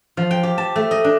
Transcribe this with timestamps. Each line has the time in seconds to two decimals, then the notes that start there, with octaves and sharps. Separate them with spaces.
0.17 F3
0.31 G5
0.43 G4
0.58 A5
0.76 A3
0.91 D#5
1.04 D4